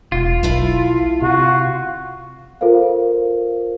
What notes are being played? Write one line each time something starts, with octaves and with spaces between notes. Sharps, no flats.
E1 F4
B1 A3 E4 F5
C3 F#4
F4 A4 A#4 C5 F5